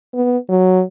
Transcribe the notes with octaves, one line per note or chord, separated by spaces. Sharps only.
B3
F#3